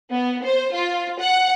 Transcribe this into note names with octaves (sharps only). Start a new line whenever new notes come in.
B3
C5
F4
F#5